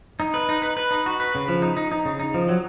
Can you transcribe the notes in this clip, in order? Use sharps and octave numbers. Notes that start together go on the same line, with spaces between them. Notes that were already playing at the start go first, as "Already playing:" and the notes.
D#4
B4
D#4
B4
B4
D#4
F#4
B4
C#3
F3
D#4
D#4
D#4
C#3
D#4
F3
F#3